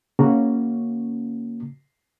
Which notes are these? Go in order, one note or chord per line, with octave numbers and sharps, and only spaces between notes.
C#3 A#3 C#4 F#4